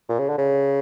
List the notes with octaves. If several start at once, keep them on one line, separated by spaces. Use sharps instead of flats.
A#2
C#3
D3
C#3